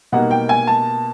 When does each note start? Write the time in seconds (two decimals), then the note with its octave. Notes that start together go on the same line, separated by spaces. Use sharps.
0.12 B2 G3 A#3 D#4 F#5
0.31 G5
0.49 G#5
0.67 A5